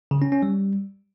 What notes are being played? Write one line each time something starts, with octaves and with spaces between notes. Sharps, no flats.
C#3
C#4
C#4
G3